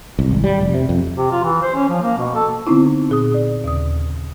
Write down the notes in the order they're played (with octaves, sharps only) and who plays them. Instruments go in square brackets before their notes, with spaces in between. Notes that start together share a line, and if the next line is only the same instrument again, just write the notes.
[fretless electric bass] C2
G#1
G3
F1
C3
F2
[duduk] C3
F4
E3
C5
C#4
F3
A#3
B2
A4
[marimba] D3 B3 C4 D#4 E4
D3
A#2 G#4 D#6
D5 D#6
D#2 C#3 D#6